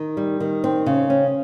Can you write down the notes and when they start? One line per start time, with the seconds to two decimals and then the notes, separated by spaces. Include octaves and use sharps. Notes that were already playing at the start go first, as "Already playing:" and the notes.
Already playing: D#3
0.17 G3
0.40 D#3
0.64 C4
0.86 C#3
1.10 C#4